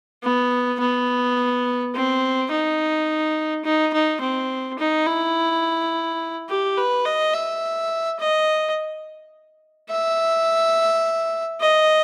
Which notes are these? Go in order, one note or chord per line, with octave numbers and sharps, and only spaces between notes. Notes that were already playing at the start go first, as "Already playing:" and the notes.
B3
B3
C4
D#4
D#4
D#4
C4
D#4
E4
G4
B4
D#5
E5
D#5
E5
D#5